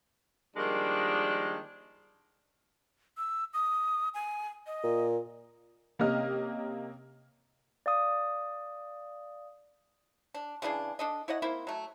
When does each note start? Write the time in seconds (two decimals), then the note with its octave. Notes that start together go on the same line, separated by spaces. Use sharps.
0.56 D#3 F3 G3 G#3 A#3 D4
3.18 E6
3.54 D#6
4.14 G#5
4.67 D#5
4.84 A#2
5.99 C3 A#3 C#4 G4 D#5 F6
7.86 D5 F5 D#6
10.34 D4
10.62 C#3 E3 D4 G#4
10.99 D4 A4 D#5
11.28 E4 C#5 D#5 F#5
11.42 A#3 C4 E4 C5
11.67 F#3 A3